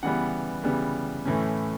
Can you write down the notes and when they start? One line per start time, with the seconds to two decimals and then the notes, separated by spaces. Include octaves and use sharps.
0.03 C#3 E3 G3 B3 F#5
0.64 C#3 E3 G3 B3
1.25 A2 E3 A3 C#4